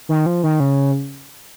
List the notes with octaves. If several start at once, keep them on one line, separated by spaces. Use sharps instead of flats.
D#3
F3
D#3
C#3